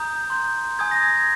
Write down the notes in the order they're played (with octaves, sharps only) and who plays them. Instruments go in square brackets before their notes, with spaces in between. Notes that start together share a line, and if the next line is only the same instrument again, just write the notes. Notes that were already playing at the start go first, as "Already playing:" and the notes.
Already playing: [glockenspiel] A#5 D#6 G6
C6 G6
G#5 D#6 G6 G#6
A#6
G#6
G#6